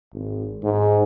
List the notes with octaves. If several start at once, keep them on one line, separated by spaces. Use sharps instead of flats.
G#1
G#2